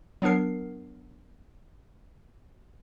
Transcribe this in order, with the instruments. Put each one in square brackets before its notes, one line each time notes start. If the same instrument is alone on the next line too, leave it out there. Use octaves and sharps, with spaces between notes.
[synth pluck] F#3 B3 D4 A#4 C7